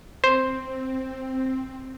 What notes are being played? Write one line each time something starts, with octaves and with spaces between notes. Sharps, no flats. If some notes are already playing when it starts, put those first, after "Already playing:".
C4 C5